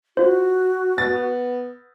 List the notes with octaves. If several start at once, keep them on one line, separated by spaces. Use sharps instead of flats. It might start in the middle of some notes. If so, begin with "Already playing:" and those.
F4 F#4 C5
B3 A6